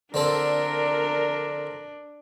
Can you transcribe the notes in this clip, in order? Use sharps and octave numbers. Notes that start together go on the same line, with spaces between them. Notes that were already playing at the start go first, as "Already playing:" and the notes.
D3 C4 D4 A4 A#4